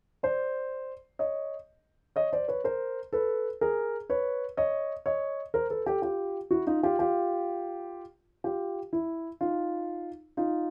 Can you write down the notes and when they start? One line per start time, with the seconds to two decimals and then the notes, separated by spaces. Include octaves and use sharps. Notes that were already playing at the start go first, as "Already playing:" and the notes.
0.23 C5 D5
1.19 C#5 D#5
2.16 C#5 D#5
2.33 C5 D5
2.48 B4 C#5
2.64 A#4 C5
3.13 A4 B4
3.61 G#4 A#4
4.10 B4 C#5
4.57 C#5 D#5
5.06 C#5 D#5
5.54 A#4 C5
5.70 A4 B4
5.86 G4 A4
6.02 F4 G4
6.51 E4 F#4
6.67 D#4 F4
6.83 F4 G4
6.99 F4 G4
8.44 F4 G4
8.93 E4
9.41 D#4 F4
10.37 D#4 F4